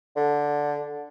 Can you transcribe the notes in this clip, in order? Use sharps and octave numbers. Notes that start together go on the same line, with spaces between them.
D3